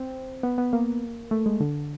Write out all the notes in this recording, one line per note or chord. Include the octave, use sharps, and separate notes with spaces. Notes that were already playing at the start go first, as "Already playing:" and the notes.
Already playing: C4
B3
B3
A#3
A3
G#3
D3